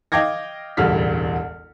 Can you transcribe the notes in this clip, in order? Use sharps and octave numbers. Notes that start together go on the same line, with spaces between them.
D#5 F5 G5 D6 G#6 A#6
E1 A1 D2 G3 F6 B6